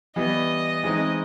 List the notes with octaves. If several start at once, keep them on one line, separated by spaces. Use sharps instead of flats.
E3 G3 B3 D#5
E3 G#3 C4 D#4